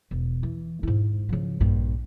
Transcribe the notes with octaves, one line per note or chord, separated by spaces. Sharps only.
E1
E3
G#2 E4
C#3 F3
A#1 G2